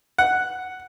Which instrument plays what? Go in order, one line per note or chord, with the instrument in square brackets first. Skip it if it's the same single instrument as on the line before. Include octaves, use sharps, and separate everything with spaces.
[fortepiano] F#5